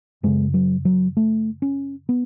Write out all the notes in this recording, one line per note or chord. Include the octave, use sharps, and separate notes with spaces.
F#2 C#3 G#3
F#3
F#3
A3
C#4
B3